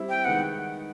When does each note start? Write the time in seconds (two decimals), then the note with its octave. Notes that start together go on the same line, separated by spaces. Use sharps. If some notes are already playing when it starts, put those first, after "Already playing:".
Already playing: G3 C4 E4
0.09 G5
0.25 D#3 G#3 B3 F#5